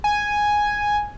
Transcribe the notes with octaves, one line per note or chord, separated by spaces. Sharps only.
G#5